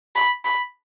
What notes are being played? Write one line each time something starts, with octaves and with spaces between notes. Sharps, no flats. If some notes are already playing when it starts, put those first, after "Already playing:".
B5
B5